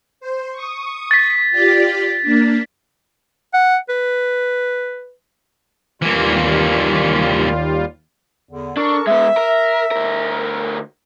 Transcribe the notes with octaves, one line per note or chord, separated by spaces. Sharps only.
C5
C#6 D#6
A6 B6
F4 G4 D5
A#3 D4
F#5
B4
D#2 E3 G3 A#3 F4
E2 D3
D4 A4 A#4 C#6
G#3 B3 E5
A#4
D2 A#4